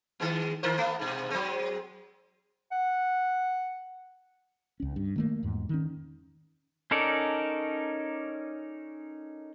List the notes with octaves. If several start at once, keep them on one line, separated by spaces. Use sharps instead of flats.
D#3 G#3 B3
D#3 A#4 C5
A3 B3
G#2 B2
F#3 G#3 C4
F#5
C#2 C#4
G2
D#3 A3 A#3
E2 G#2
D#3 C#4
C#4 D#4 A4 A#4 D5